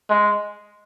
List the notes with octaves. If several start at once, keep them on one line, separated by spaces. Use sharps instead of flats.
G#3